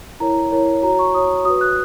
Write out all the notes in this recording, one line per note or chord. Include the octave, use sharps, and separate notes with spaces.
E4 A#4 C#5 A#5
E4 A#4 C#5
F#4 C#5 A#5
C#6
F#4 C#5 D#6
F#4 B4 D#6
F#6